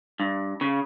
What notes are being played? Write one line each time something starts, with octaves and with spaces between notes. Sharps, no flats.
G2
C#3